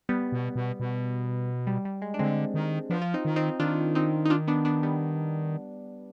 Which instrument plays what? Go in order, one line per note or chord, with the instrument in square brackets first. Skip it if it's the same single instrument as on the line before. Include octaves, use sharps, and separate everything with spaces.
[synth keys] G3 B3
[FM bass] B2
B2
B2
[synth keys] G3
G3
G#3
D4
[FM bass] D3 [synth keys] G#3 C4
[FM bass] D#3
[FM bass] F3 [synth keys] B3 D4
[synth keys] F4
C4 D#4
[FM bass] D#3
[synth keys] C4 D#4
[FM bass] D#3 [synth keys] D4 F4
[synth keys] C4 D#4
D#4
D4 F4
B3 D4
B3 D4
G3 B3